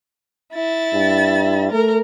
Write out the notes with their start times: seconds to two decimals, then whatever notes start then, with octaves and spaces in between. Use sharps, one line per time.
0.53 E4 A6
0.94 G2
1.72 A3 A#4